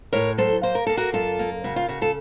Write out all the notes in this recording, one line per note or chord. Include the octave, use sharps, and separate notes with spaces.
A2 A#4 C#5
F#3 A4 C5
A#3 C5
A#4
A#3 A4
F#4 A#4
F#2 F4 A4
A#3
C#3 F#4
F4
C#3 F#4
F4 A4